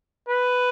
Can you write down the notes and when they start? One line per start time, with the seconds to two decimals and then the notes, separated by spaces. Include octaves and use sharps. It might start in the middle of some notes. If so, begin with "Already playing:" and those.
0.29 B4